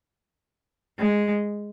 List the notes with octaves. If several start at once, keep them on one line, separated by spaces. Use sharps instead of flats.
G#3